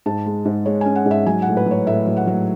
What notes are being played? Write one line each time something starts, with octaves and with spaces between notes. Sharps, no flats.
G#2 A5
G#3
G#2
G#3 C#5
C#4 G#5
F#5
G#2
E5
F#3 G#5
F#5
A2
B4
F#3 C#5
A2 E5
F#3
F#5
F#3